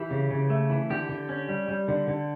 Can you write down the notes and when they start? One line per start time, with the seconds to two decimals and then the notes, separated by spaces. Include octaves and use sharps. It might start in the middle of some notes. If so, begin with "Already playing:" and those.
Already playing: E3 G4
0.11 C#3
0.31 C#3
0.50 A3
0.70 E3
0.90 D3 G4
1.09 D3
1.29 C#4
1.49 G3
1.69 G3
1.88 D3
2.08 D3